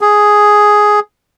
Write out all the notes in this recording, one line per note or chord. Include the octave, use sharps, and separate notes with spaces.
G#4